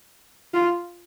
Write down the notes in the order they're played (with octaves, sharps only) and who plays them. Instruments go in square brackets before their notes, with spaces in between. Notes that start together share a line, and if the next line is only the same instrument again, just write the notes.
[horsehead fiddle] F4